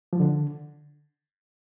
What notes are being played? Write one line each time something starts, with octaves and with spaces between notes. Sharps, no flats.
F3
D3